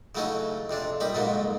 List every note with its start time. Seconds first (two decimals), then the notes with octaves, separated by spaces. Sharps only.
0.15 C#3 E3 F#3 A3 C#4 D#4
0.70 F2 C3 D4
1.00 A#1 G3 D#4 B5
1.14 F2 G#2 C#3 F#3 A#3